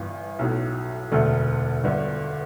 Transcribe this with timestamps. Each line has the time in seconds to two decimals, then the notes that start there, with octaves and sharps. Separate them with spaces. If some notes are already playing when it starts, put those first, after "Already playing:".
Already playing: G1 G2 E3
0.39 B1 A2 F#3
1.11 E1 D2 D3 A3
1.83 G1 G2 D3